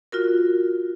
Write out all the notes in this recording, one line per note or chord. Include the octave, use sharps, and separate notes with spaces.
F4 F#4 A#4